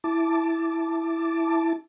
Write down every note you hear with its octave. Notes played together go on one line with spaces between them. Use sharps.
E4 A5 D6